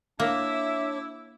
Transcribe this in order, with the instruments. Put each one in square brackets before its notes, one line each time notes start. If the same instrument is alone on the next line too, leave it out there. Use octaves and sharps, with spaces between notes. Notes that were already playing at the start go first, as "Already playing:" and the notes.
[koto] A#3 [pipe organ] D4 C#5 D6 [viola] E4 [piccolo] E5